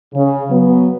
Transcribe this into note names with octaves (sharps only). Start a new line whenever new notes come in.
C#3
F#3 B3